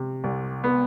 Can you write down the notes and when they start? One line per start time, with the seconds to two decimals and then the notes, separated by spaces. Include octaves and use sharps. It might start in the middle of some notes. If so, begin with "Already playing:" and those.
Already playing: C3
0.24 C2
0.64 B3